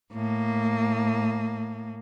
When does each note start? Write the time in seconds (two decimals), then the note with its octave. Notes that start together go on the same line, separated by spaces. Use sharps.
0.12 A2 A#3